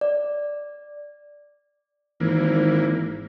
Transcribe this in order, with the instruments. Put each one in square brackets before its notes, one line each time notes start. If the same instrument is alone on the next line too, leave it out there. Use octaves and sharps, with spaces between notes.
[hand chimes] D5
[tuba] G#1 [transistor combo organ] E3 A#3